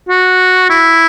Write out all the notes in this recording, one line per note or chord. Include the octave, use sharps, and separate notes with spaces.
F#4
E4